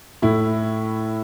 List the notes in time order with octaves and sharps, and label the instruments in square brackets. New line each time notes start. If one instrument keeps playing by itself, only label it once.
[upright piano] A2 E4